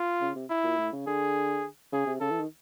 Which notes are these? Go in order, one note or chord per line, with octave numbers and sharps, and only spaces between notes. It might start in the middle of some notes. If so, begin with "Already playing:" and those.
Already playing: F4
C#3
C3
E4
A#2
A2
C#3
D3 G#4
C#3 G#4
C3
C#3 A4
E3
D#3